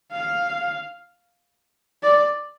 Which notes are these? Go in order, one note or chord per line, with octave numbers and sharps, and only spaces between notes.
F5
D5